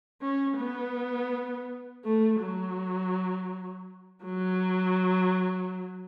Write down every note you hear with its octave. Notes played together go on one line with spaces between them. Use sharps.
C#4
B3
A3
F#3
F#3